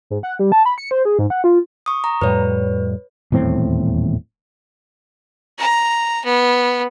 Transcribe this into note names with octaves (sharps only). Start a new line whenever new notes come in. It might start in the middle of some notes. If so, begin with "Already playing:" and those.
G#2
F#5
G3
A5
B5
C#7
C5
G#4
G#2
F#5
F4
C#6 D#6
A#5
F2 A2 G3 B4 C#5
D#1 E2 A2 C4
A#5
B3